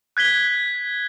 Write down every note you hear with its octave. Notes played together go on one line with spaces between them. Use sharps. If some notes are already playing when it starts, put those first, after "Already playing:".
F#6 G#6 B6 G7